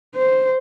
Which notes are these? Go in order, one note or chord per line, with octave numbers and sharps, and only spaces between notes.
C5